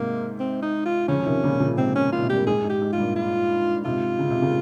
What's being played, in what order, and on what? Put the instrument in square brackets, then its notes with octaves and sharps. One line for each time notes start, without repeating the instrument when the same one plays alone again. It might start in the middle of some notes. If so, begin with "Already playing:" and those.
Already playing: [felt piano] G#2 C3 [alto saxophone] A#3
[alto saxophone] C4
D#4
F4
[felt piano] C#3 F3 [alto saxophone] C#4
[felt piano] F3
C3 D#3
A#2 C#3
A#2 C#3
[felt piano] G#2 C3 [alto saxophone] C4
[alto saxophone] C#4
[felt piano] A#2 [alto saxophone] F4
[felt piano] C3
[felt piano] G2 A#2 [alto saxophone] G4
[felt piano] G#2 [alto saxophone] G#4
[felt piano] G#2
[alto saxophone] G4
[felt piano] G#2
[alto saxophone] F4
[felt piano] G2 A#2
[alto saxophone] F4
[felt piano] G#2 C3 [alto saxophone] F4
[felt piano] C#3
C3
A#2 C#3